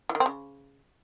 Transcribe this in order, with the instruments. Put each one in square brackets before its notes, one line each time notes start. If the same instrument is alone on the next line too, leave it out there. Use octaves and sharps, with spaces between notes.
[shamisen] E3
D#3
C4
C#3